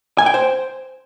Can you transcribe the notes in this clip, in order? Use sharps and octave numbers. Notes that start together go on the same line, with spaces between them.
G#5
G5
C5